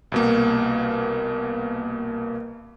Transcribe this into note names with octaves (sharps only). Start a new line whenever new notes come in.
C2 B2 A#3